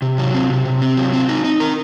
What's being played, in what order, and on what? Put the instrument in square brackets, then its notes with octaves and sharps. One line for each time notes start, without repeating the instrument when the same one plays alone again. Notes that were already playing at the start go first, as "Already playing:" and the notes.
[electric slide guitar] C3
F#3
C4
C3
C3
C4
F#3
C4
D#4
D#4
A#4